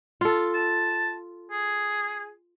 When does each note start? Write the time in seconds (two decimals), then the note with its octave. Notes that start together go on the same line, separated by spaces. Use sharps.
0.21 F4 A4
0.54 A5
1.51 G#4